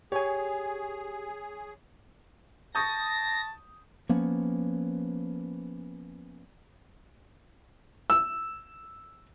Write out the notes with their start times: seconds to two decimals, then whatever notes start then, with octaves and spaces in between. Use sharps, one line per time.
0.12 G4 G#4 C#5 G#5
2.75 A5 C#6 D#6 G6 A#6
4.09 F3 A#3 B3 C#4
8.10 E6